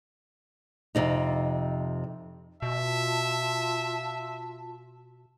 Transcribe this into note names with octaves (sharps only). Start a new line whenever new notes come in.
F2 C3 D#4
B2 F4 E5 A5